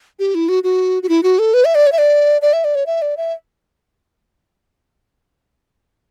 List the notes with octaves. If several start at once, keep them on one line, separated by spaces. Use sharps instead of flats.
G4
E4
F#4
F#4
F#4
E4
F#4
A4
B4
E5
D5
C#5
E5
D5
D5
E5
D5
C#5
E5
D5
E5